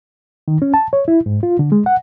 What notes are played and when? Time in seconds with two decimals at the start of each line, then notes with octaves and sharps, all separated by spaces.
0.48 D#3
0.62 C#4
0.74 A5
0.93 C#5
1.08 E4
1.26 G#2
1.43 F4
1.59 D3
1.72 G#3
1.86 F#5